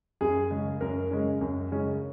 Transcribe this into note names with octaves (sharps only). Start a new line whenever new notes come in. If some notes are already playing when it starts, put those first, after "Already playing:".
F#2 G#4
C#3 G#3 C#4
F#2 A#4
C#3 G#3 C#4
F#2
C#3 G#3 C#4